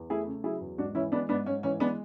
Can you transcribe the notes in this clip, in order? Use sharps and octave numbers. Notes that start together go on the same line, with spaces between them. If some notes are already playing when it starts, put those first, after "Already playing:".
Already playing: E2
A3 E4 G#4
C#3
F#3 E4 G#4
E2
G#2 D4 F#4
E3 C#4 E4
G#3 B3 D4
G#2 B3 D4
G#2 C#4
E3 C#4
G#3 B3 D4